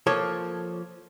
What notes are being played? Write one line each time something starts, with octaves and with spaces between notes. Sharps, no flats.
F3 A#3 A4 C#5